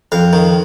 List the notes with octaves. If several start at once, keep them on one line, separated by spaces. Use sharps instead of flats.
F2 F5
D#3